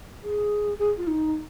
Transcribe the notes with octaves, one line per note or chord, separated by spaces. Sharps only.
G#4
G#4
F4
D#4